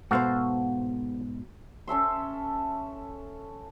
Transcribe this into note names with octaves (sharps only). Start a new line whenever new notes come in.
G#2 B2 F#4 A4 C5 F5
C#4 A4 E5 C6